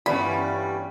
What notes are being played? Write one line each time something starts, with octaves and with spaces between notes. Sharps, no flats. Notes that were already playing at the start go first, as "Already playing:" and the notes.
G1 E3 G3 B3 C#4 D5 F5 B5